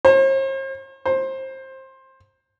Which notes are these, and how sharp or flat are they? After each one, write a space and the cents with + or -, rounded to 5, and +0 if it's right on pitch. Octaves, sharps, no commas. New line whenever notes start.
C5 +45
C5 +20